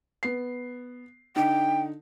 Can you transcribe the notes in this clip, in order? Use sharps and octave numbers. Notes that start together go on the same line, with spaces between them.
B3 C7
D3 D#4 G5